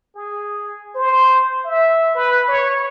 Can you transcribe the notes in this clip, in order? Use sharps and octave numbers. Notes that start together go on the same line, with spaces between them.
G#4
C5
E5
B4
C#5